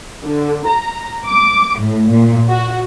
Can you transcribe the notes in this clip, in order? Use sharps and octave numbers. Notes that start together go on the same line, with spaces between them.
D3
A#5
D6
A2
A#2
F#4